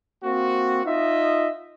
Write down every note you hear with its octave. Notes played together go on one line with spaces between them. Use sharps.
A#3 C4 F#4
D#4 F4 D#5 E5